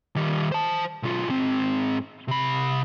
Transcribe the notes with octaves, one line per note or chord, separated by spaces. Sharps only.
D#3 G3
C5 A5
B1 F4
G#2 C4
C3 B5